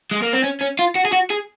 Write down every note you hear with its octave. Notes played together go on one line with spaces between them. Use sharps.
G#3
A#3
C4
C#4
C#4
F4
F#4
G#4
F#4
G#4